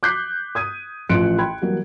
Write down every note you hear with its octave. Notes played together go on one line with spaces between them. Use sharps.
D6 F#6 G6 B6 C7
D#6 G#6 D#7
A1 F3 C6 F#6 C#7 D7
G5 B5 C6 G#6
E3 F#3 G3 A#3